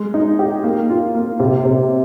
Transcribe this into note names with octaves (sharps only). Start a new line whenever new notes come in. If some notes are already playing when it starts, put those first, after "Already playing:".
Already playing: G#3
D#4
G4
A#3
F4
A#3
C3
C3